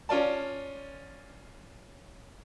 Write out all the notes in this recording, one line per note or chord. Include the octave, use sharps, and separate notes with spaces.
C#4 F4 D5 A5